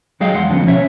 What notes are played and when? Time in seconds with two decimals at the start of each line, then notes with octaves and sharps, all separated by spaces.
0.20 F#3 G#3 G#4 D#5 F5 G5
0.34 E2 F#5 C6
0.49 D3 F3 B3 C#4
0.67 B2 C#4 C#5 E5